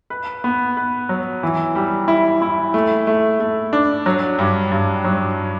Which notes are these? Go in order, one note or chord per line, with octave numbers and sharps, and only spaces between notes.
B4
B3
B4
F#3
E3
G3
E4
E4
A3
A3
A3
D4
F#3
G2
G2
F#3